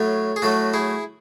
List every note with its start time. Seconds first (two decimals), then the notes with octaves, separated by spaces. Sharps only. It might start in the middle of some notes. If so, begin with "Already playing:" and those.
Already playing: A2 F#3 A3 A4 C#5
0.36 G#4
0.42 A2 F#3 A3 F#4 A4
0.74 E4 G#4